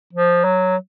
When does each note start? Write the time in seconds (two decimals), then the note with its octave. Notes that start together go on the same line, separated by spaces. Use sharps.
0.13 F3
0.44 F#3